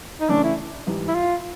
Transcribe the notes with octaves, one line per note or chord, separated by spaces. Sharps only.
D#4
C#3 E3 A3 C#4 D4
E4
G#2 E3 G3
E4
F4